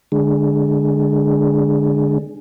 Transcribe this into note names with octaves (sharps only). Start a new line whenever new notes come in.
D3 G#3